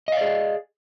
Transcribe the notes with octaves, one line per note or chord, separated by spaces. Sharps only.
G#4 D5 D#5 F5